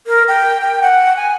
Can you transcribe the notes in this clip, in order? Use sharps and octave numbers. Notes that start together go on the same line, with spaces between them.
A#4
G5
G5
F#5
G#5